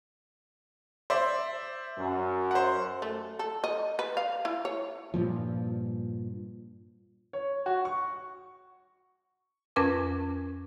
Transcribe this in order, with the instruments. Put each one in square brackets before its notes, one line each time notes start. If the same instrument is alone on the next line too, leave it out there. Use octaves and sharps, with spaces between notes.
[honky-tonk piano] C5 D5 E5
[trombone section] F#2
[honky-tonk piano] C5 F#5
[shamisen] A3
A4
D#5
B4
F5
E4
C#5
[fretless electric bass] G2 A#2 F3
[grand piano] C#5
F#4
C#6
[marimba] F2 C#4 A#4 B4 G#5 D6